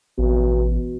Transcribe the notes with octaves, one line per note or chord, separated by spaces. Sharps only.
A1 B2